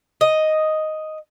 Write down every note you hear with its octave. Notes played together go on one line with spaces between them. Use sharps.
D#5